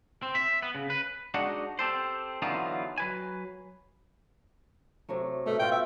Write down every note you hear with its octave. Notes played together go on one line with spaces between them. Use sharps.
C4
E5
B3
C#3
B4
G#3 D4 D#4 F#4 F#5
C4 G4 A4 C5
D3 E3 F#3 B3 D#4 F4
F#3 B4 G#5
C3 F#3 A3
B2 A3
B2 F4 F#4 G5
E5